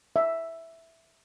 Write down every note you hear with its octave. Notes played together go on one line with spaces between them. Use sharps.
E5